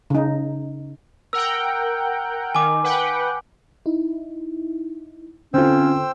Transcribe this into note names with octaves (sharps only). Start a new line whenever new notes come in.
C#3 D#4
A#4 F#5 G5 E6
D#3 G#5 D6
B4 F#5 G5
D#4 E4
D3 C4 C#4 F4 A4 C5 G5 E6